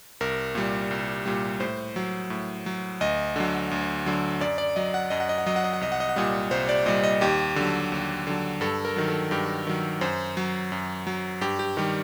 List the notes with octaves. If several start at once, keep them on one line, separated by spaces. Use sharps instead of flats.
C2 A#4
A#2 G3
C2
A#2 G3
A2 C5
F#3
A2
F#3
D2 D#5
D3 F#3
D2
D3 F#3
F#2 D5
D5
F#3 D#5
F#5
F#2 D#5
F#5
D#5
F#5
F#3 D#5
F#5
D#5
F#5
C2 D#5
F#5
D#5
F#5
A#2 G3 D#5
C2 C5
D5
A#2 G3 D#5
D#5
D#2 G4
D3 F#3
D#2
D3 F#3
G2 A4
A#4
D#3 F#3
A4
G2 G4
D#3 F#3
F#2 C5
F#3
F#2
F#3
G2 G4
G4
D#3 G3 G4